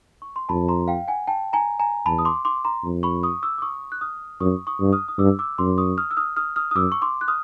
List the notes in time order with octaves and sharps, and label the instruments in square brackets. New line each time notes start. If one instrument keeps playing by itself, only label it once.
[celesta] C#6
C6
[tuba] F2 [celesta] A5 B5
[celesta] A#5 C6
F5 G5
F#5 G#5
G5 A5
G#5 A#5
G#5 A#5
[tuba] E2 [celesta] A5 B5
[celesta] D#6
C6 D6
C6 D6
A#5 C6
[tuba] F2
[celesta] B5 C#6
C#6 D#6
D6 E6
D6
C#6 D#6
F#6
D#6 F6
[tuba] F#2 [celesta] C#6 D#6
[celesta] C#6 D#6
[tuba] G2
[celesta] D#6 F6
D#6
[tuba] G2 [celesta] D6 E6
[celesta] D6 E6
[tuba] F#2 [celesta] C6 D6
[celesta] C#6 D#6
D#6 F6
E6
D#6 F6
D#6 F6
D#6 F6
D#6
[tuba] F#2 [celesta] D6 E6
[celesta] C#6
C6 D6
F#6
D#6 F6